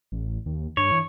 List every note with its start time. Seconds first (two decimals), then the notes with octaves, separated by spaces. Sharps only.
0.12 A1
0.46 D#2
0.77 G2 C#5
0.92 E3